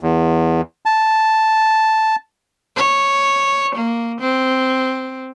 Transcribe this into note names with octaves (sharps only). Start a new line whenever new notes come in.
E2
A5
C#5
A#3
C4